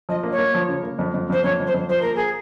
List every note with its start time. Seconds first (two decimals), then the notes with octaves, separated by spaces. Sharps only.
0.09 F3 D#5
0.23 A#3
0.32 C#5
0.38 A#3
0.54 F3
0.69 C#3
0.83 A#3
0.99 F2
1.14 F2
1.30 F2 C5
1.44 F2 C#5
1.59 F2
1.66 C5
1.74 F2
1.89 F3 C5
2.02 A#3 A#4
2.16 G#4